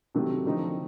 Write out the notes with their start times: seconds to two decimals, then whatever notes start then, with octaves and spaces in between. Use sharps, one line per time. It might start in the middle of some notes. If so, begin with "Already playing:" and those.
0.15 C3 D#3 F#3 A3
0.45 D3 F3 A3 C4 D#4